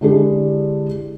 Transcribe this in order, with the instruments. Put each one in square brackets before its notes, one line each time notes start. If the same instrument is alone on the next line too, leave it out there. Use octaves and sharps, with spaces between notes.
[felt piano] D3 G#3 D4 E4 G4 G#4